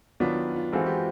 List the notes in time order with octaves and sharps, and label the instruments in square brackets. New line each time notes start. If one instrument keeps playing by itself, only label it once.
[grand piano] D#3 F#3 B3 D4 [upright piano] F4
[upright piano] F4
[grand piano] E3 G#3 C4 F4 A4 [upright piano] F#4
[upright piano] G4